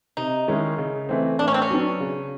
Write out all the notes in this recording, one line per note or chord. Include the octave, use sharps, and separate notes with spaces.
C3 D#4
D#3 G#3 C#4 E4
C#3
E3 A3 C4
A2 D4
C#4
C4
C#4
F#3 B3 D4
C#3